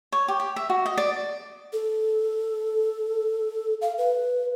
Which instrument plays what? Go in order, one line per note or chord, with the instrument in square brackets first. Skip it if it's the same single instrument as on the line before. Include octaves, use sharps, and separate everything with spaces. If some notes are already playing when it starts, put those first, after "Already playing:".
[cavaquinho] C#5
G4
G4
E5
F#4
D#5
D5
[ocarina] A4
F5
B4